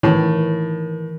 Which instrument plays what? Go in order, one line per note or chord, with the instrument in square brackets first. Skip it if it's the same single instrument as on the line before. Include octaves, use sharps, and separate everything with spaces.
[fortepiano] A2 [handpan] D#3 E3